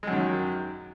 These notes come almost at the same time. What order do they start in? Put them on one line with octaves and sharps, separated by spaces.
G#3 F#2 D#3 F#3